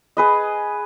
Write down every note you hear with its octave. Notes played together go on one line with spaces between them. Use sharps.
G#4 B4 D#5